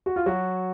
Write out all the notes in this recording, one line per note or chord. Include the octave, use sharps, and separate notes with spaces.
F#4
F4
F#3 F#4